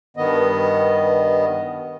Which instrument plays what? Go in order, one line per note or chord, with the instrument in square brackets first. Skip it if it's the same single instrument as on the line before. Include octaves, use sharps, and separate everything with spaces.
[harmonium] G2 D#3 B3 D#5